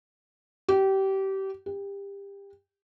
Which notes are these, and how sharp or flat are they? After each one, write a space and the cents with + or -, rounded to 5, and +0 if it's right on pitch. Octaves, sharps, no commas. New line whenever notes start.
G4 -25
G4 +25